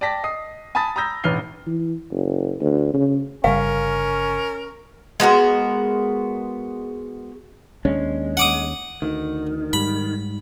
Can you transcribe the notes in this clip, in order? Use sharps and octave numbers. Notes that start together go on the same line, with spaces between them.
D5 G5 A5 A#6 B6
D#5 D#6 C7
G#5 A5 B5 D#6 A6
A#5 B5 D#6 E6 G6 A#6
E1 A1 B4 F6 C7 G7
E3
F#1
D2
C#3
G1 C#3 G3 C#4 A#4 F5
G#3 B3 F#4 A#4
D#2 G#3 C#4 D4
F#5 D6 D#6
D2 D#3
G#2 G3 B5